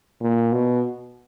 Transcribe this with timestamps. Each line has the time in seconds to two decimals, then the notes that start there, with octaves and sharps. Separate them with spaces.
0.21 A#2
0.52 B2